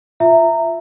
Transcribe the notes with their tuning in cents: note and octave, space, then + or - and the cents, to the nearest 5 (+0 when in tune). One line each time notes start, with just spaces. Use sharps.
F4 +0 E5 +5 A#5 -20